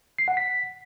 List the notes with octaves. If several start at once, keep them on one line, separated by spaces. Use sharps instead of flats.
C7
F#5
B6